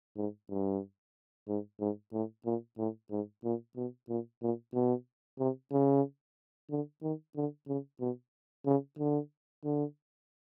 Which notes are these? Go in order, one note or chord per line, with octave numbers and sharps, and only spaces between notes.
G#2
G2
G#2
G#2
A2
A#2
A2
G#2
A#2
B2
A#2
A#2
B2
C3
C#3
D3
D#3
D3
C#3
B2
C#3
D3
D3